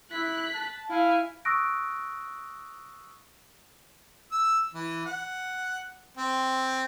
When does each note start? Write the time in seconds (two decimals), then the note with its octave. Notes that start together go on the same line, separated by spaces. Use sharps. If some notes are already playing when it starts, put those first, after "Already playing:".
0.11 E4 F#6 B6
0.54 A5
0.90 E4 F5 G#5
1.45 C#6 D#6 E6 F#6 A#6 D7
4.32 E6
4.74 E3
5.06 F#5
6.18 C4